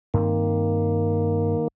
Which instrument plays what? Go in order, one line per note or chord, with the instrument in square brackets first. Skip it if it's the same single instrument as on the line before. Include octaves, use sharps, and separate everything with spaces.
[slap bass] G2 C4 [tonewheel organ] D#3 A#3